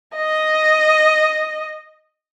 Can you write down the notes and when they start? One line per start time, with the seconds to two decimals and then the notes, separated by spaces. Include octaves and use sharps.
0.17 D#5